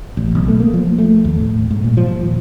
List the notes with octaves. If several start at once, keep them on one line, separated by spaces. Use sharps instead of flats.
A1
B1
A3
A#3
F3
A3
D#2
A2
G#2
A#2
F3
D#1